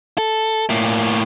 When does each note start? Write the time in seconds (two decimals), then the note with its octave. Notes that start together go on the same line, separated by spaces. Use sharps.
0.18 A4
0.70 A2 A#3